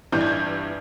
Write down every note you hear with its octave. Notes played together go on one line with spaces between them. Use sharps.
G1 G2 E3 G3 G6
G#6
G6